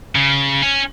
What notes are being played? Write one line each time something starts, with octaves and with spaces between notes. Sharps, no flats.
C#3
C#4